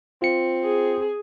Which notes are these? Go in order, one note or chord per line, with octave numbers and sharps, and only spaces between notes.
C4 F4 C#7
G#4